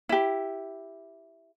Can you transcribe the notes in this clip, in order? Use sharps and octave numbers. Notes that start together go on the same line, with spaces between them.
E4 G4